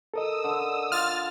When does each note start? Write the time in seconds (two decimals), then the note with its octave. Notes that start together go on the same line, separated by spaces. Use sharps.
0.14 A4 A#4 D#5 D#6 E6
0.44 D3
0.92 F4 F6 A6